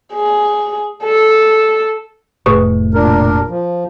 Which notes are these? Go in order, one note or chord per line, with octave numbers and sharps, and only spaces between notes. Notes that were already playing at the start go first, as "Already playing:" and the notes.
G#4
A4
F1 A2 G#4 B4 C#6
A#2 D4 A#4
F3